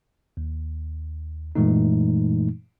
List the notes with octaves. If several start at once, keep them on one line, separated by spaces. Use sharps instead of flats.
D#2
F#2 A#2 E3 G#3 A3 D#4